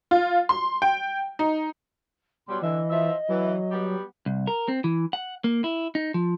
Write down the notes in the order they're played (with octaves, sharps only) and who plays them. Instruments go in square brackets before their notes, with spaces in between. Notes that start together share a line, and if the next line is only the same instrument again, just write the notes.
[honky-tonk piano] F4
C6
G5
D#4
[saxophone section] B2 F#3 G3 [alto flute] C6
[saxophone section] D3 E5 [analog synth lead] E3 [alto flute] D#5
[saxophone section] F3 E5
[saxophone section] E3 [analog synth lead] F#3
[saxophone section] G3 B3 G4
[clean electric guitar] C2
A#4
C4
E3
F#5
A#3
E4
D#4
F3